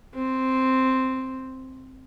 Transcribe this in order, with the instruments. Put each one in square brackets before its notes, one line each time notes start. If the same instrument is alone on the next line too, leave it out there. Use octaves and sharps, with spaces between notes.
[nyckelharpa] C4